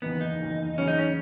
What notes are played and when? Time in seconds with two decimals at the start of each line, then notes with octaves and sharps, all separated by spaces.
0.02 F#1 E2 D#3 B3
0.21 D#4
0.40 F#1 E2 D#3
0.78 E2 C#3 F#3 C#4
0.88 D#4
0.99 C#4